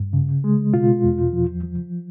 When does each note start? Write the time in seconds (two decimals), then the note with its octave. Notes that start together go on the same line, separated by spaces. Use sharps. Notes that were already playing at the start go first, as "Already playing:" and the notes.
Already playing: G2
0.13 C#3
0.44 G#3
0.73 B2 F4
1.04 E2
1.33 F3
1.63 F3